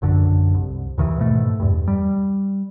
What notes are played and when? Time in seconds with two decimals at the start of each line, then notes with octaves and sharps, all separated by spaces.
0.02 A#1 F#2 D3
0.54 C2
0.98 D#2 D#3 E3
1.18 G#2 B2 A3
1.60 E2 G2
1.88 G3